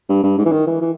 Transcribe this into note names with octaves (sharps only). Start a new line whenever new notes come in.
G2
G2
G#2
E3
D#3
E3
E3